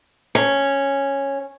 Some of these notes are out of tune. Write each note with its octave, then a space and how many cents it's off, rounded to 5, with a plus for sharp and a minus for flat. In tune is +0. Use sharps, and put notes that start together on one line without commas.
C#4 -5